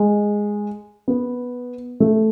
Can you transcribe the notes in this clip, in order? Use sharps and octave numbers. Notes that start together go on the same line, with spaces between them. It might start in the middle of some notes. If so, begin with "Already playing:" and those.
Already playing: G#3
B3
A3